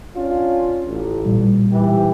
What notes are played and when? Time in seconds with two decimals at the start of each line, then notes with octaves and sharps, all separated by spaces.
0.15 C#4 D4 F4
0.87 A1
1.25 A#2 G3
1.71 G#2 E3 G4